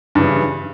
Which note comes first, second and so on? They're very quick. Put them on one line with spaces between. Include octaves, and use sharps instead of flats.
G2 C#3 E3